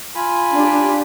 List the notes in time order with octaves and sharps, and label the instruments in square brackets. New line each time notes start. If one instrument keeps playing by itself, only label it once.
[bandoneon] F4 G#5 B5
[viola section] D4 G4